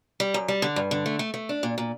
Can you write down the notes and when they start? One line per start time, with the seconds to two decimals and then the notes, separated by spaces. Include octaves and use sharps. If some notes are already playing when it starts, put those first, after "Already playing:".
0.20 G3
0.34 F#2
0.48 G3
0.62 D3
0.76 G2
0.91 D3
1.06 A3
1.19 A3
1.34 A3
1.49 D4
1.63 A#2
1.78 A#2